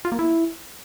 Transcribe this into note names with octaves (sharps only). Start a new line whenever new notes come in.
F4
A#3
E4